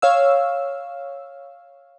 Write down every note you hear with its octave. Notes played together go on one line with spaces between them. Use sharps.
C#5 F5 E6